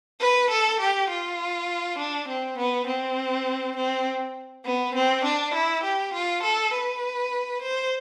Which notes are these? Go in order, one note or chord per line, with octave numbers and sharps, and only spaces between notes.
B4
A4
G4
F4
D4
C4
B3
C4
C4
B3
C4
D4
E4
G4
F4
A4
B4
C5